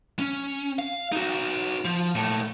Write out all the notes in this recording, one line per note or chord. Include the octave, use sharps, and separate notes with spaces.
C#4
F5
D#4 F#4
F3
A#2 A3